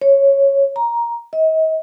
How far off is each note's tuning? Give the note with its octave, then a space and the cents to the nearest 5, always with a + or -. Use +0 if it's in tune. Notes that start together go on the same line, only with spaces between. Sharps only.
C#5 -10
A#5 +10
D#5 +40